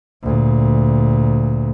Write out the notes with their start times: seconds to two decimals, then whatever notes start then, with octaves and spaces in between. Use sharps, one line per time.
0.23 D2 A#2